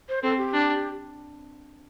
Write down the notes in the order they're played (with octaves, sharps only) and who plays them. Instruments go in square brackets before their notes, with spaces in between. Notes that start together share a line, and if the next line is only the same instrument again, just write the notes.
[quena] C5
[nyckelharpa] C4 [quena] A4
[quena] G4
[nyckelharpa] D4